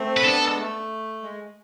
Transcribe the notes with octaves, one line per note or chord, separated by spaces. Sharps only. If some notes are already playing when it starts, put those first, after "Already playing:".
Already playing: A3 C4
B4
B3 D4 A4
G#3
A3
G#3